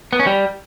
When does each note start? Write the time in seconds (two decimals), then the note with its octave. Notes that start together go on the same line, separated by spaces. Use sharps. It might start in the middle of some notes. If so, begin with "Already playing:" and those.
0.13 B3
0.20 C#4
0.27 G3